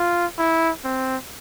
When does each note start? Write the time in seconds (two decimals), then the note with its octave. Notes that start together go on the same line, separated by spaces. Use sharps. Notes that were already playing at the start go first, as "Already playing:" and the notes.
Already playing: F4
0.39 E4
0.84 C4